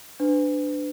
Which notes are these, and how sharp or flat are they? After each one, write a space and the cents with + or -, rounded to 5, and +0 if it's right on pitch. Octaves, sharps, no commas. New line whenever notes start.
D4 +5 B4 +35